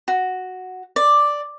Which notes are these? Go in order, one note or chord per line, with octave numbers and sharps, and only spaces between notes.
F#4
D5